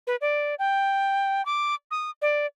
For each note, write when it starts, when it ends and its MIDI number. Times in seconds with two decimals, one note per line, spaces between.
0.07 0.16 71
0.21 0.55 74
0.59 1.44 79
1.46 1.75 86
1.91 2.10 87
2.22 2.46 74